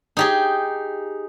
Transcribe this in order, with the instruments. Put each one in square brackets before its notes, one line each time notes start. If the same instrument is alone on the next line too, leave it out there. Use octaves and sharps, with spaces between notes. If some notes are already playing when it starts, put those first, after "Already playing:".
[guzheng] D#4 G4 G#4